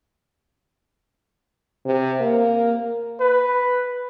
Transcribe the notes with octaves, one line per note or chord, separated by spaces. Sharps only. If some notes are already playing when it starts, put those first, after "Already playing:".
C3
A#3
B4